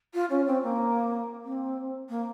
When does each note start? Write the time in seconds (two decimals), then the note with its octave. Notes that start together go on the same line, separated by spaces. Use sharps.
0.14 F4
0.30 C#4
0.47 C4
0.63 A#3
1.43 C4
2.09 A#3